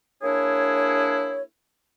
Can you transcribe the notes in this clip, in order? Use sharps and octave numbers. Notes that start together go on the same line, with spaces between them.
A#3 D4 E4 G#4 C#5